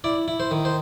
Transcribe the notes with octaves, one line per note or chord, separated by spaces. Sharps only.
E4 D5
E4
C5
D#3
C5